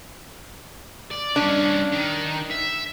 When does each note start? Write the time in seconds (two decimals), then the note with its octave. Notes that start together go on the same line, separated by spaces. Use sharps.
1.11 D5
1.36 G2 C#4 D4
1.92 D#3
2.51 E5